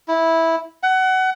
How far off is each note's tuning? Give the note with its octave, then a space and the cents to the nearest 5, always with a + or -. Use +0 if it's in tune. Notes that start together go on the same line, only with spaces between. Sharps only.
E4 -10
F#5 +25